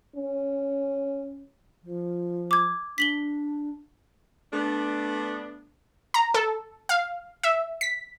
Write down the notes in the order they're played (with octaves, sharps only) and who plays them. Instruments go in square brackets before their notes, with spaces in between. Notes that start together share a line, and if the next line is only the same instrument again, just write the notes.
[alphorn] C#4
[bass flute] F3
[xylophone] D6 G#6
[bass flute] D4 [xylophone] B6 F#7 G7
[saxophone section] A3 B3 D4
[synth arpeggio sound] A#5
A4
F5
E5
B6